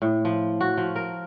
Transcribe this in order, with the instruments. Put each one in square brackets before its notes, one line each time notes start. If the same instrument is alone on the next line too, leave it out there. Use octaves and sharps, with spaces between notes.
[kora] A2
F3
F#4
F3
A#4